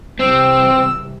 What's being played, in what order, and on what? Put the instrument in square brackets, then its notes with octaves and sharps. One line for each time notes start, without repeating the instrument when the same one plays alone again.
[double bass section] C2 E3 [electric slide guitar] C4 [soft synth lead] E6